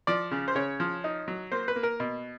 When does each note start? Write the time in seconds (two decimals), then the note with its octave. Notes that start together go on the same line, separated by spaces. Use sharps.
0.07 F3 D5
0.31 C#3
0.48 C5
0.55 C#3 C#5
0.80 F3
1.04 D#4
1.28 F#3
1.52 A#3 C5
1.68 B4
1.76 A#3
1.83 A#4
2.00 B2